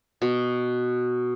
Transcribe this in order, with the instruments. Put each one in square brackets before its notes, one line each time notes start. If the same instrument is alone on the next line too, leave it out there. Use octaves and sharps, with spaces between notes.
[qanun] B2